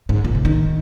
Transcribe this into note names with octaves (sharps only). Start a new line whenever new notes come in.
G#2
A#2
C3
D#3